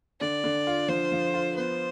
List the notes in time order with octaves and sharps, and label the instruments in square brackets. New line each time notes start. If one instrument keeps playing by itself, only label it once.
[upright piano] D3 [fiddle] D5
[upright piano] D3
F4
[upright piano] F3 [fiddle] C5
[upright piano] F3
F4
[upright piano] B3 [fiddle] C5